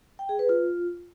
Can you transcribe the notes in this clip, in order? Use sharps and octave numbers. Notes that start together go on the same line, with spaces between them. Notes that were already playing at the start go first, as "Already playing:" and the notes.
G5
G#4
B4
F4